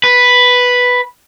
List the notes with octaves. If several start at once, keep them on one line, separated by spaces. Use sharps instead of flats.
B4